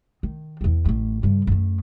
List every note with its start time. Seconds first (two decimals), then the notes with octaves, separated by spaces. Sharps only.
0.23 D#3
0.61 E2 C4
0.85 A1 A3
1.23 G2 C#3
1.47 F#2 A3